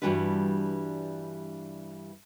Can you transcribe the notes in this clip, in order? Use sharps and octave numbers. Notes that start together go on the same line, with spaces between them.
G2 E3 G3 D4 F#4 B4